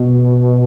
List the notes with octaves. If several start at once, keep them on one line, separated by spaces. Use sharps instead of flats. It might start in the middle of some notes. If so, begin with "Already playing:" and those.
Already playing: B2